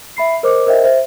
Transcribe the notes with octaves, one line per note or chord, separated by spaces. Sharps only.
E5 B5 C7
A#4 C5 D#5 D6
A#4 C5 D#5 E5 G5
C5 E5